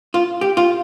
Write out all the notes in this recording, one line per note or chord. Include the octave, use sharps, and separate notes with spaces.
F4
G4
F4